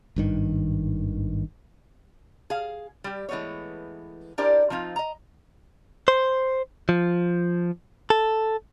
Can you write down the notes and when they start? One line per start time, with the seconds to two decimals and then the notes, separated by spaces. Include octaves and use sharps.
0.16 G#1 G2 D#3
2.50 G#4 F5
3.04 G3 G4
3.29 E3 G#3 A3 B3 C#5
4.38 D4 E4 G4 A#4 C5 D5
4.70 F3 C4 D#4 F4
4.96 D#5 A#5
6.08 C5
6.89 F3
8.10 A4